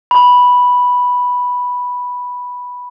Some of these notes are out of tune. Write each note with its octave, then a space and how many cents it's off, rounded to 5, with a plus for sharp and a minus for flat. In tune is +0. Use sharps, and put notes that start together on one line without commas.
B5 -5